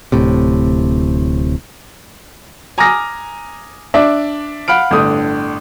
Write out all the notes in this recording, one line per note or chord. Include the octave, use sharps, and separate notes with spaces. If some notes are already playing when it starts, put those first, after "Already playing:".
D1 A2 C3
G#5 A#5 D6 D#6 F6 A#6
D4 D5 E5
F5 F#5 B5 F6 D7
G1 A2 D3 D#6